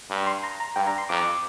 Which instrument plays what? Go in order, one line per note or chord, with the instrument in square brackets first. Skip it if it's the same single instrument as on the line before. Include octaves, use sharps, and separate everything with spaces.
[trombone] G2
[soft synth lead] C6
A#5
A#5
[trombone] G2 [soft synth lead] G5
[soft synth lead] A#5
C6
[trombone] F2 [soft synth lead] D6